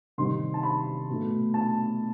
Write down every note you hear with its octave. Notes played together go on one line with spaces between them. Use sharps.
C3 D#3 G3 C6
A5
B5
B2 A3
A5